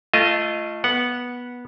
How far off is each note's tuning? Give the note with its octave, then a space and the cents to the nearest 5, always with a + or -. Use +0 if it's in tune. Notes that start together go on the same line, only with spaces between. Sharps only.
A3 +0 F4 -25 D#5 +0
B3 -15 F#5 +0